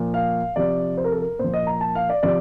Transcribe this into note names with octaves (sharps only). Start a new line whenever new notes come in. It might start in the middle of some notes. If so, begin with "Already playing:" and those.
Already playing: A#2 F3
F5
C3 F3 D5
C5
A#4
A4
A#4
A#2 F3 C5
D#5
A#5
A5
F5
D5
C3 F3 D5